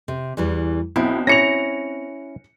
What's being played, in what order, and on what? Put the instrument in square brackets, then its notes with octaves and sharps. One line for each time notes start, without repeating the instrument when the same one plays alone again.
[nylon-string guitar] C3
E2 E3 G3
[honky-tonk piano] B1 [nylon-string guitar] C4 [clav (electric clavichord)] E4
[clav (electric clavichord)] C#4 E4 C#5 [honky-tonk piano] A#6 C#7 F7